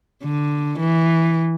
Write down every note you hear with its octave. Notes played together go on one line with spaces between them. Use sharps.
D3
E3